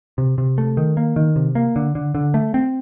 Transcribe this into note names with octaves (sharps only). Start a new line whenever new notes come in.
C3
C3
A3
D#3
A#3
D#3
C3
A#3
D3
D3
D3
A3
C4